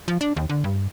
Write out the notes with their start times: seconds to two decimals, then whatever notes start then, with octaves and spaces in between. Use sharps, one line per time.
0.08 F3
0.21 D4
0.37 D#2
0.49 D3
0.64 G2